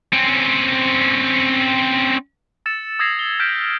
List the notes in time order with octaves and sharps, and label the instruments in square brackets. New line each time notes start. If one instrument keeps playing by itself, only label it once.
[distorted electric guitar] C4 C#4
[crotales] E6 A6 C#7 E7
D#6 E6 G#6 A#6 C7 E7
G7
F6 G6 B6 D7 E7